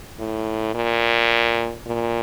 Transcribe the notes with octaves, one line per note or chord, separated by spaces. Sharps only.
A2
A#2
A#2